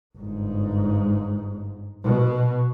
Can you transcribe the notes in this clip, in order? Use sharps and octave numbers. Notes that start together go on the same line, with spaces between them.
G1 G#2
B2